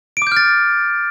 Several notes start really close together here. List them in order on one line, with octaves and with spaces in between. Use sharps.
D7 D6 G6 F6 A6